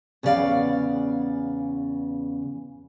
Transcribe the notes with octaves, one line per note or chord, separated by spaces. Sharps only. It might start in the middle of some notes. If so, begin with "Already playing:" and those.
E2 C#3 B3 F#4 D5 F5